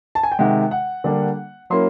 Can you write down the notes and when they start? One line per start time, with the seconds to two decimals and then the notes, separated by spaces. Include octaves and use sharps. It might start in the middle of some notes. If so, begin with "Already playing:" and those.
0.15 A5
0.23 G#5
0.32 G5
0.39 C3 D#3 G#3 F#5
0.71 F#5
1.04 D3 G3 A#3 D4
1.70 F#3 A#3 C#4 E4 C6